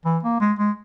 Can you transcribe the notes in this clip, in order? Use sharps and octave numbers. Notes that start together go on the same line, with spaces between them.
E3
A#3
G#3
G#3